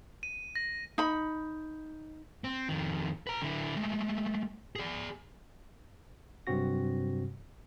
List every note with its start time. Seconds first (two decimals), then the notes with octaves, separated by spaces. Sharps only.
0.23 D#7
0.56 A#6
0.98 D#4 B5
2.44 C4
2.69 F2 D#3
3.27 B4 A#5
3.41 D3 E4
3.76 G#3 A3
4.76 G#4 D5
6.47 G2 C3 F#3 C4 F#4 A#6